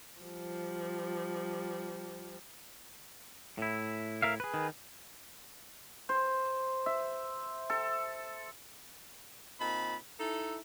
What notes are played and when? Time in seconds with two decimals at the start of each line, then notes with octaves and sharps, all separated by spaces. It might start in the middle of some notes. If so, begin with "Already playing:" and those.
0.21 F3 G3
3.58 A2 E4
4.22 A#4 E5 F5
4.40 G#4 B4
4.54 D#3
6.09 C5
6.86 E5
7.70 A4
9.59 A#2 C4 D#4 A5 B5
10.19 D#4 E4 A4